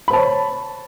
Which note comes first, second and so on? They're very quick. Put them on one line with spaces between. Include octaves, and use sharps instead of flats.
B5 C5 A5 C#5